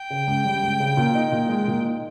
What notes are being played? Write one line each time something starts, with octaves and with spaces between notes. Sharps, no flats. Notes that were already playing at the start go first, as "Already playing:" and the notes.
Already playing: G5
C#3
C#2
G3
C#2
C#3
A#2
D#4
A#2
G#3
A#2
D#4